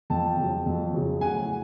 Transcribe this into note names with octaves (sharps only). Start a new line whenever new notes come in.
F2 G5 A5
C#3 F#3
F2
C#3 F#3
A2 F#5 G#5